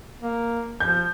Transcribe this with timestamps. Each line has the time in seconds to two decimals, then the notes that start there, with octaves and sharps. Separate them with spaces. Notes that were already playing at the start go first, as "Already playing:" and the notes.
0.22 A#3
0.80 F3 G6